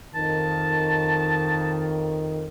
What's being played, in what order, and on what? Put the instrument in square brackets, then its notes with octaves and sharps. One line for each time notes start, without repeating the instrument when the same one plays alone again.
[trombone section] F2 D#3 [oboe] A5